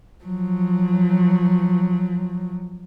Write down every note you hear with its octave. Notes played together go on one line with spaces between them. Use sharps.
F3 F#3